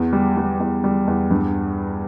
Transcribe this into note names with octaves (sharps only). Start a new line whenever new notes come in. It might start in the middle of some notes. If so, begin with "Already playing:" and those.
Already playing: E2
G3
G3
E2
G3
E2
G2